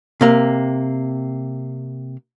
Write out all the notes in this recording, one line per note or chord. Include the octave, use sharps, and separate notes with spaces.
C3 A#3